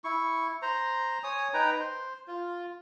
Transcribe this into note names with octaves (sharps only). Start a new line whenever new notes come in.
E4 C#6
C5 A#5
C#5 G#5 D#6
D#4 B4 G5 A#5
C5
F4